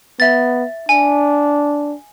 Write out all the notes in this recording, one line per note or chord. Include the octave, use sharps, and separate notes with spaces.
B3 E5 A6
D4 G#5